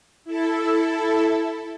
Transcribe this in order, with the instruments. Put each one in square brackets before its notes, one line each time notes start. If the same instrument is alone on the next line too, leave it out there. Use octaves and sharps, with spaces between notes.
[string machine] E4 A4